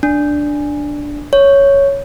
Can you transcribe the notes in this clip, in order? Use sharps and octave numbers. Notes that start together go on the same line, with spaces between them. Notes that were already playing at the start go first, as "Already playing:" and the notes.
D4
C#5